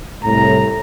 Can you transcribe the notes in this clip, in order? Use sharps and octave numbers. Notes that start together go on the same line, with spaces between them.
C2 A2 A#5